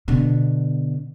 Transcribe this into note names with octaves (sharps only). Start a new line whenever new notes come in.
B2 D3